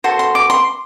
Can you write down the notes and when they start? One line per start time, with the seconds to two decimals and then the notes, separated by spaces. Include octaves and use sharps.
0.04 F#4 A4 C5 C6
0.19 C6
0.35 D6
0.50 C6